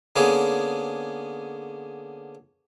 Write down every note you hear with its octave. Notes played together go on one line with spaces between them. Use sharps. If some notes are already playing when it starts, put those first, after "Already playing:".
D3 A#3 B3 C#4 G#4